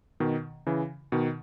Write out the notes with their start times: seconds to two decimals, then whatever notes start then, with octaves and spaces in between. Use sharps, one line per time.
0.20 B2 D#3
0.66 C#3 E3
1.12 B2 D#3